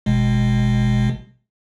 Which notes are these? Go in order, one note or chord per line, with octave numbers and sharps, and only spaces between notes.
G#1 B2 G#3